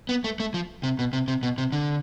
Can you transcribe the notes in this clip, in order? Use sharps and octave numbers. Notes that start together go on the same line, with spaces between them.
B3
A3
A3
F3
C3
B2
C3
C3
B2
C3
D3